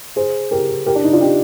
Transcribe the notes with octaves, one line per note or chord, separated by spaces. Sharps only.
G#4 C5
G4 A#4
G4 A#4
D4
D#4
D4 F4
D#4 G4